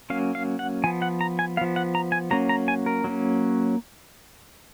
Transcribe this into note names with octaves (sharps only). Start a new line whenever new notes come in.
F#3 A#3 C#4 F5
F5
F#5
F3 B3 G#5
F#5
A#5
G#5
F3 B3 F5
F#5
A#5
G#5
F#3 A#3 C#4 A#5
A#5
G#5
A#4
F#3 A#3 C#4